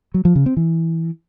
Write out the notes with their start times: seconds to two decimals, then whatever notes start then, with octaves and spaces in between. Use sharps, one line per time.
0.14 F#3
0.25 F3
0.35 C#3
0.46 C4
0.57 E3